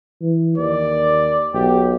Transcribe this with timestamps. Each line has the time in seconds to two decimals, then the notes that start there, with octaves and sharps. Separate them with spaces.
0.22 E3
0.58 D#2 D5
1.54 B1 G4